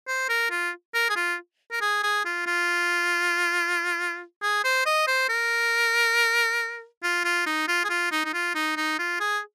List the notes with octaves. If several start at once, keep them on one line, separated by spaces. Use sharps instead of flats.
C5
A#4
F4
A#4
G#4
F4
A#4
G#4
G#4
F4
F4
G#4
C5
D#5
C5
A#4
F4
F4
D#4
F4
G#4
F4
D#4
D#4
F4
D#4
D#4
F4
G#4